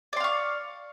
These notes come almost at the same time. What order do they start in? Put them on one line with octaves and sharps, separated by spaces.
D5 C6 F5 C#6